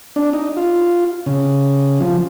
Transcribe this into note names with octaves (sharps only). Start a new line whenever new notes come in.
D4
D#4
F4
C#3
F3